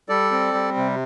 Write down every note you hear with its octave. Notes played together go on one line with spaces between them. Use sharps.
G3 A4 D5
C4
G3
C3